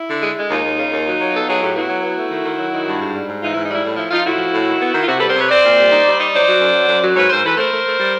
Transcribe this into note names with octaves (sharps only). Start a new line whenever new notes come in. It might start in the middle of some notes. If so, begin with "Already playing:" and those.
Already playing: E4
D3
G#3
G#3
D#2 D#4 F4
D#2
C#3
D#2
F#3
F#3
B3 A4
F#3 G#4
A2 G4
B3 E4 F#4
F#3
B3
A3
D#3
D#3
F#3
D#3
G2
G#2
G3
G#2
E3 D#4 F4
G#2 E4
D#4
G3 E4
A2
F3 E4
F3 D#4 F4
A2 E4 F#4
F3
A2
D#3
B3
D#3
F4
C3 E4 F#4
G3 A4 B4
A#4 C5
C3 B4 C#5
C4 C5 D5
A#2
G3
D#4
G3
D#4
F#3 C5 D5
F#3
F#2
F#3
F#2
F#3
G#2 B4 C#5
G#2 A#4 C5
E3 A4 B4
A3 A#4 C5
A3
A3
G3